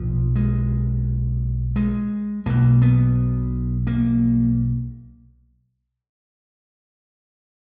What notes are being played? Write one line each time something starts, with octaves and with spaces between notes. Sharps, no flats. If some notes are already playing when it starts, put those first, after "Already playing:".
Already playing: B1 A#2 F3
G#3
G#3
B1 B2 A#3
B3
A#3